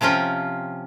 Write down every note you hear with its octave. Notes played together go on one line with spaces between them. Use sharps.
C3 F3 C#4 F4 G5